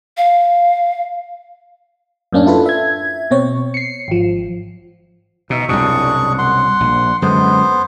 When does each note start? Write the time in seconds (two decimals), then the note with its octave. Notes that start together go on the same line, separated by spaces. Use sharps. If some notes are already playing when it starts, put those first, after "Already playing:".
0.17 F5
2.33 F#2 A2 A#3 C#4 D4
2.45 D4 E4 F4 A4 B4
2.66 E5 G#6
3.31 B2 C4 C#5
3.74 C7 C#7
4.08 G#1 F3
5.50 B2 D#4 E5
5.69 C2 F#2 B2 D4 G#4 C#6
6.38 F#5 C6
6.80 A#1
7.22 F#2 D3 G#3 B3 C5